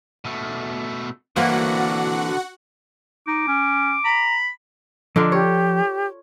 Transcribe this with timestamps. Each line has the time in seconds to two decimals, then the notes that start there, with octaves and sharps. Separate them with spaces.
0.25 B2 A3
1.36 D3 E3 A#3 C4 F#4 A#4 F#5
3.27 D#4 D6
3.48 C#4
4.05 A#5 B5
5.16 D3 F3 D4 F4 A#5
5.32 G4 C#5